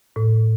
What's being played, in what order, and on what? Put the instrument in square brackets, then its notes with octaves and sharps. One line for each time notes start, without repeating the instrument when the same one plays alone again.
[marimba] A2